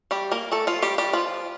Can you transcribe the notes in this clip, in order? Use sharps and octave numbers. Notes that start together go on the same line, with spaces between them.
G3 G4
A#3 A#4
A3 A4
F3 F4
G3 G4
G3 G4
F3 F4